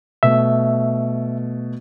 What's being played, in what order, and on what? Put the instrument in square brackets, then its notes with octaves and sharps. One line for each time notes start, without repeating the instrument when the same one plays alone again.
[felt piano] B2 A3 [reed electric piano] E5